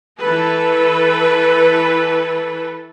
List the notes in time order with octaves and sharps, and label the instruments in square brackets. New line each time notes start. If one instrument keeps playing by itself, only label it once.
[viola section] E3 A4 B4